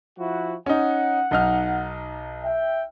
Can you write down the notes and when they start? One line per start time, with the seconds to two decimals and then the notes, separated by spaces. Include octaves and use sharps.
0.18 F3 E4 F#4
0.66 C#4 D#4 F#5
1.31 B1 D#4 F6
2.44 E5 G5